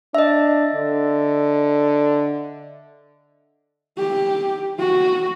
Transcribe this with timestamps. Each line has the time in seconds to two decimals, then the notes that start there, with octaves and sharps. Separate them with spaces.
0.15 D4 D#5 E5
0.75 D3
3.98 G4
4.79 F#4